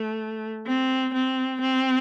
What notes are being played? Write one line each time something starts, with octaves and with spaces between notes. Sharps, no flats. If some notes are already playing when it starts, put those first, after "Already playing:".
Already playing: A3
C4
C4
C4